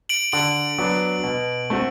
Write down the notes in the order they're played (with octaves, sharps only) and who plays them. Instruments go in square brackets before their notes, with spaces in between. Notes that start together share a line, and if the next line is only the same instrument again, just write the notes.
[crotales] D7 F#7
[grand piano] D3 [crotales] D7 F#7
[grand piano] F#3 B3 D4
B2
A3 C4 F#4